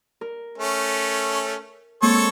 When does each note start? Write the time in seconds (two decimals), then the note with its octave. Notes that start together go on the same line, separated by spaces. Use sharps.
0.21 A#4
0.58 A3 C#4
2.02 G#3 A#3 C4 A4 C#5 C#6